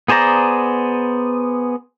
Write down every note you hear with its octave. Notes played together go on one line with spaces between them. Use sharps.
B3 G#4 C5 D5 A#5